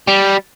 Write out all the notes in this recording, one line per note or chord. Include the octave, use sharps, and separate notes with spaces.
G3